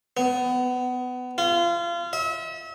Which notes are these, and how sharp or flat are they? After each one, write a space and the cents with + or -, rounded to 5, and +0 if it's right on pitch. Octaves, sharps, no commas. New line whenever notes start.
B3 +25
F4 -30
E5 -35